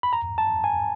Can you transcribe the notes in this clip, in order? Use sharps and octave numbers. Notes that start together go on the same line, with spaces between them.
B5
A#5
A5
G#5